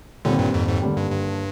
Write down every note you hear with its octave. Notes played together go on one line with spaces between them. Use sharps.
D#2 A#2 D3 D#3 G3 C4
G2 A#2
F2 G#2
F2 G#2
D#2 D3 G3
G2
G2